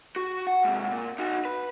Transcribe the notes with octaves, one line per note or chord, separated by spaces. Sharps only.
F#4
F#5
G#2 C3
A#2
D#4 F#4
B4